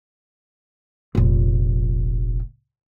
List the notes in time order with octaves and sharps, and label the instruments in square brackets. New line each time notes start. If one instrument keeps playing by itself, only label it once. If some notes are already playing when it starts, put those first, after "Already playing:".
[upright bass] F1 A#1